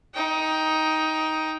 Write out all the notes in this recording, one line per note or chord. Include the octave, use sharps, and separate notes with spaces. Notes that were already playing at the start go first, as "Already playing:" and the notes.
D#4 G5